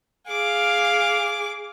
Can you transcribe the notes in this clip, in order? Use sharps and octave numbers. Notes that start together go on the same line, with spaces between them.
G#4 F5 D6